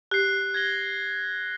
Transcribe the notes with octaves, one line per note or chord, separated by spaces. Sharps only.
G4 F#6 C7
G#6 A#6 G7